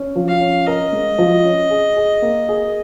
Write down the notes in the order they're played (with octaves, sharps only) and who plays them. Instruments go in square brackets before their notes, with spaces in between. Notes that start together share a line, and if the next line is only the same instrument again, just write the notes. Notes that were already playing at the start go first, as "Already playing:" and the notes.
Already playing: [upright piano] C#4
F3
[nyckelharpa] F5
[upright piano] C#4
[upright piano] A#4 [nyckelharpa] D#5
[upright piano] G#3
F3
C#4
G#4
G#4
A#3
G#4